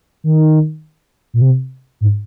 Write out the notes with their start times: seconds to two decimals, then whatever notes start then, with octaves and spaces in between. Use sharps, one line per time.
0.24 D#3
1.33 A#2
1.41 C3
2.01 G#2